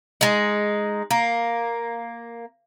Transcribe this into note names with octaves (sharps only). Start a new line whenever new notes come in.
G#3 D#4
A#3